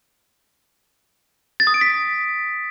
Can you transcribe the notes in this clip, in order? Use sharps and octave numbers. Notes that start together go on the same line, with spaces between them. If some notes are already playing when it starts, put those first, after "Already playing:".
A6
D#6
D7
B6